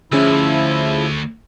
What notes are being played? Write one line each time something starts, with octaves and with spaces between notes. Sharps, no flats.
D2 F3 C#4 E4 G#4 E6